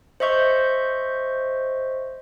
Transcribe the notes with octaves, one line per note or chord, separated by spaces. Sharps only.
C5 D#5 E5 C#6 G6